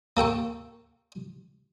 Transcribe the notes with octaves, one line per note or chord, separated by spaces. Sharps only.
A#3 A4 G5 C#6